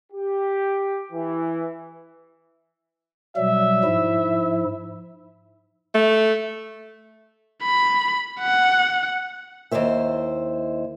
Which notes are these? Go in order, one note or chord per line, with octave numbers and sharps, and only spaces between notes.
G4
E3
B2 F#3 G3 E5
G#2 F3 E4
A3
B5
F#5
D#2 A#2 E4 C5 E5